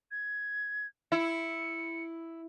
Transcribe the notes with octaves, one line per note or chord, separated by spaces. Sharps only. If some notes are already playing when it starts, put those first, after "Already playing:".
G#6
E4 C#7